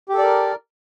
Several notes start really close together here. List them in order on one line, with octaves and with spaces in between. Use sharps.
G4 A4 D5 A#4